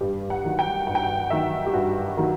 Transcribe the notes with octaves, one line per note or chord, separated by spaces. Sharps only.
G2 G4
F#5
D#3 F#3
G5
G2 F#5
G5
F#5
D#3 F#3 E5
G4
G2 F#4
D#3 F#3